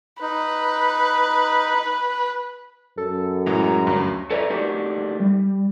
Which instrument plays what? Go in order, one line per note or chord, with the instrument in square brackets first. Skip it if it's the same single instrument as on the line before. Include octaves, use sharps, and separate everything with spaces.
[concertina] D#4 [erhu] B4
[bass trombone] F#2 [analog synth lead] A4
[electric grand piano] A2 E3 G#3 [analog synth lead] A#5
[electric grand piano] D2 G2
[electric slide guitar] A4 B4 C#5 D5 E5 A#5
A3 D4 D#4 F#4 G4 A#4
G3